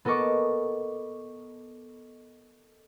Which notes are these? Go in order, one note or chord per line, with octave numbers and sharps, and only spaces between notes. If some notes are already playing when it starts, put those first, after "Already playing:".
B3 A4 A#4 D#5 C#6 D6